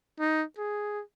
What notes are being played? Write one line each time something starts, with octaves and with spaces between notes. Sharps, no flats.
D#4
G#4